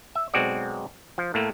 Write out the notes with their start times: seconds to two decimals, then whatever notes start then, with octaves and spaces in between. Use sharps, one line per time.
0.15 E5
0.34 B1 G#3 C4 F#4 D5
1.18 F3
1.34 A2 A3 A#3